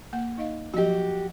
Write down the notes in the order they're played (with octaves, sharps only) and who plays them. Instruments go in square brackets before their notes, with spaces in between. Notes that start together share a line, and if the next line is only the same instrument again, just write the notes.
[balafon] A#3 F#5
D#4 D#5 F5
[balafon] F3 F#3 D#5 [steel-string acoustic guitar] F#4 G4